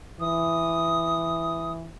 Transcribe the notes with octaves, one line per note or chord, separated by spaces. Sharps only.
E3 D#6